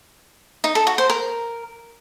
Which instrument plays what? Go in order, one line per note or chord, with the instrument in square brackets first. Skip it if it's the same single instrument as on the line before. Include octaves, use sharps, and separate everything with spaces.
[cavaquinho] D#4
A4
F#4
C5
A#4